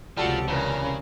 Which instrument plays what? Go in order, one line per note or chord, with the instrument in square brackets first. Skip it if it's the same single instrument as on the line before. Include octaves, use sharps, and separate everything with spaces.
[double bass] C#2 C3 [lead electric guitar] F3 [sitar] G3 A4 [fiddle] F#4
[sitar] A#2 E3 [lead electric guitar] C#3 [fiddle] C#4 A#4